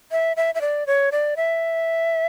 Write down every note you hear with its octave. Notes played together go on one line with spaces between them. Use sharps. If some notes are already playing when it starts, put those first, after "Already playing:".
E5
E5
E5
D5
C#5
D5
E5